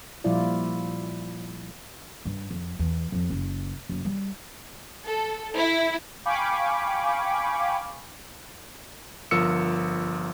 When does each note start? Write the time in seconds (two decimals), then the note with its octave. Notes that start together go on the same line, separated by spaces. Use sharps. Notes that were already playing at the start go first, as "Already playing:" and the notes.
0.24 A#2 F3 G3 E4 F4 D5
2.25 G2
2.51 F2
2.79 E2
3.12 F2
3.30 F#1
3.89 F#1
4.05 G3
5.07 A4
5.57 E4
6.25 F5 G5 G#5 B5 C#6 D6
9.31 G1 F3 A#4 E6 C#7